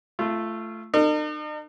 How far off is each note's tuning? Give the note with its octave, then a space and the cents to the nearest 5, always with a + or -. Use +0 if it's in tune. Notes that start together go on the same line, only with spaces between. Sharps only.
A3 +0 F4 -25
D#4 -45 A#4 -45